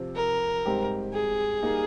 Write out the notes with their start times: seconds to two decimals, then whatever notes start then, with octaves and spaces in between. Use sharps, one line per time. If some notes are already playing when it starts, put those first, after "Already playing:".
Already playing: C3 F3 C4
0.16 A#4
0.66 G#2 G3 C4 G4
1.14 G#4
1.63 G3 A#3 D#4 A#4